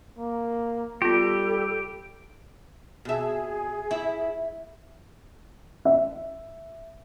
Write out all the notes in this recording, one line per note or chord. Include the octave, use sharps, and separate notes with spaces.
A#3
G3 B3 F4 G4 A4
B2 G#4 E5
E4
E5